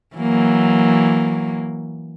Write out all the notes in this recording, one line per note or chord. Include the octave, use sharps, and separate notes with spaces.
E3 F#3 A#3